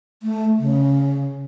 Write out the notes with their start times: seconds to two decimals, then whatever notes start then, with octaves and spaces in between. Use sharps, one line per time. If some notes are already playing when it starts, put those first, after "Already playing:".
0.23 A3
0.59 C#3